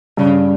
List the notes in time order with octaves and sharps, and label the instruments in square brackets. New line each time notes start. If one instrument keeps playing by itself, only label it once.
[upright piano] G2 [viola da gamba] C#3